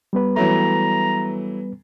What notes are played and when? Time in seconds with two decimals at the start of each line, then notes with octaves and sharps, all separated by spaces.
0.13 G3 B3 B4
0.36 E3 F#3 A3 A#5